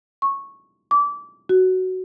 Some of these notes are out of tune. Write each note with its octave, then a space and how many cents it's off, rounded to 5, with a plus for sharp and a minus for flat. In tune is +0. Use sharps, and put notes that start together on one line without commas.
C#6 -10
D6 -25
F#4 +10